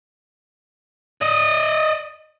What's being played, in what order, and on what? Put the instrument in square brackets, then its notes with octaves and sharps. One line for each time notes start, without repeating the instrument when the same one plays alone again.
[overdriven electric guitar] D5 D#5